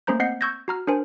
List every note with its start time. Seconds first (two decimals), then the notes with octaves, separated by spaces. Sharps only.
0.07 A3 A#3 C#4 C5 A#5 G6
0.20 C4 D#5 F#5 G6 C7
0.41 C#6 E6 G6 G#6 A#6
0.68 F#4 A#5 F6
0.87 D4 A#4 C5 G#5